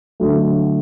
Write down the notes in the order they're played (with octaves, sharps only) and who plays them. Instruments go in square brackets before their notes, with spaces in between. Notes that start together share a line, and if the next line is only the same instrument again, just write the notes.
[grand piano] D3 F#3 A3